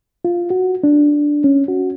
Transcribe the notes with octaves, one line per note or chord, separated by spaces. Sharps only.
F4
F#4
D4
C#4
F#4